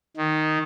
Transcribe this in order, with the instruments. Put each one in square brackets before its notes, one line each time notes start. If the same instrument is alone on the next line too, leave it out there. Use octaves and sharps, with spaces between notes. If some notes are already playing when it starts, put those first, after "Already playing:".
[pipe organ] D#3